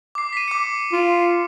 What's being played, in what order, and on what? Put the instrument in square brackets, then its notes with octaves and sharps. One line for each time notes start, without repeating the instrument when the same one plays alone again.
[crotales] D6 C7
B6 D#7
D6 C#7
[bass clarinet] F4